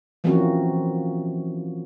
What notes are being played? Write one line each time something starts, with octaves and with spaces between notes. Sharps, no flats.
E3 F3 A#3 C4 C#4 F#4